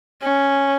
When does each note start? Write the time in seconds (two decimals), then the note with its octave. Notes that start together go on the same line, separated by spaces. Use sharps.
0.23 C#4